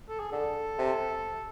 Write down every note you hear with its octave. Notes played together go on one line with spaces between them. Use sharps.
A4
G#4
D3 A4
C3